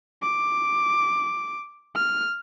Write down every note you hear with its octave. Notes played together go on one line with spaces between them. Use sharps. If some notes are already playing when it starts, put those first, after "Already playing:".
D6
F6